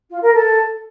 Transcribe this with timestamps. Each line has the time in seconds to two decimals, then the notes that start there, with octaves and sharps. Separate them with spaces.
0.10 F4
0.22 A#4
0.34 A4